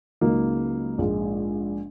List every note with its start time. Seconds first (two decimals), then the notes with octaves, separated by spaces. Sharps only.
0.21 C#2 C#3 F#3 A#3 D#4
0.98 A#1 G#2 G#3